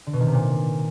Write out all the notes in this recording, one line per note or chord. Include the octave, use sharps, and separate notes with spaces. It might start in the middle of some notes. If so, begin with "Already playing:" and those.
D3
B2
D#3
C3
A#2